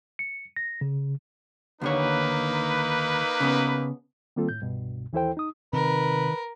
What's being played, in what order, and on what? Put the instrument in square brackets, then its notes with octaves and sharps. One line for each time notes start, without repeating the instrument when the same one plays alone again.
[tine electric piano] C#7
A#6
C#3
[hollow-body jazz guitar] D#2 D3 C#5 [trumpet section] A#3 D#4 B4
[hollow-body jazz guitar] C#3 B3
[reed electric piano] D#3 G3 A#3 C4 F4 A4
A2 G6
C2 G2 B2
D#2 E3 E4 A4 C5 G5
D#4 D#6
[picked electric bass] C3 C4 [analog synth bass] D#3 [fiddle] A#4 [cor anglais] B4